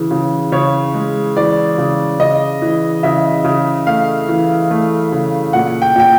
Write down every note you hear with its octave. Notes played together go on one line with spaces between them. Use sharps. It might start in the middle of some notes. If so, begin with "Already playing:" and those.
Already playing: C#3 E3
C#3
C#3 C#5
G#3
E3 D5
C#3
C#3 D#5
E3
C#3 E5
C#3
A3 F5
E3
A3
C#3
A#2 F#5
G5
A#2 G5